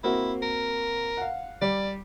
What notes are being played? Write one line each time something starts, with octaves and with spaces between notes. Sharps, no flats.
A#3 C4 E4 F#4
A#4
F5 F#5
G3 D5